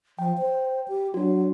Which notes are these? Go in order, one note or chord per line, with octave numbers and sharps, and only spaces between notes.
F3 G5
C5
G4
F#3 D4 F#4